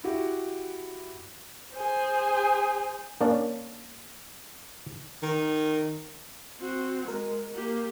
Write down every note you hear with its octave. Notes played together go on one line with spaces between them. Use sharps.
E4 F#4 G4
G#4 C5
A#3 C#4 D4 D5
D#3
C4 F#4
G#3 A#4
A#3 G4